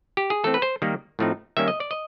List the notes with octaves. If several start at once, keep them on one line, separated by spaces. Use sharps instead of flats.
G4
G#4
E3 A3 C4 A4
B4
C5
D#3 G3 A#3
A2 F3 A3 C4 D#4
D#3 G3 A#3 C#4 E5
D#5
D5
D#5